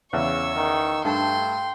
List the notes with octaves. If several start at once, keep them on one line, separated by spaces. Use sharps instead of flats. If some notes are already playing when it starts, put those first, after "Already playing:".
E2 C#3 C#5 C#6 E6
D#3
G2 A3 G5 A5 C6